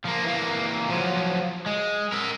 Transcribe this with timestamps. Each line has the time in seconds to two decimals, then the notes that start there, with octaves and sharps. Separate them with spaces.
0.05 F3 A#3
0.25 E3 A#3
0.90 F3 F#3
1.66 G#3
2.13 A#4 E5